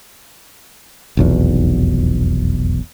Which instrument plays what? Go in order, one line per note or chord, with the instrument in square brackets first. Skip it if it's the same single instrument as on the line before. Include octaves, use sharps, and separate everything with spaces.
[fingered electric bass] F1 B1 E2